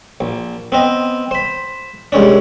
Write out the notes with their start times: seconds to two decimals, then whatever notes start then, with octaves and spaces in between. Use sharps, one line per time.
0.20 A#1
0.72 B3 C4 D#5
1.31 C5 B5
2.12 C2 G#3 C#4 D4